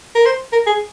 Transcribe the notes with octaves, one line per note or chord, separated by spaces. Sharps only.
A#4
C5
A#4
G#4